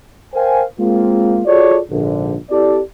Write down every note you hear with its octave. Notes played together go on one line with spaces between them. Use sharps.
A#4 C5 F5 G5 G#5
G#3 A#3 C4 F4
F4 F#4 G#4 A4 C#5 D5
A#1 G#2 D3
C4 E4 G4 A4 D5